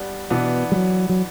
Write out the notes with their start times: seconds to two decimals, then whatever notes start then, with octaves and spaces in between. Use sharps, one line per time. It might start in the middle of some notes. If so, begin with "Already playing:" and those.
Already playing: G3 B3 D4
0.30 B2 E3 B3 D4
0.72 G3
0.76 F#3
1.09 F#3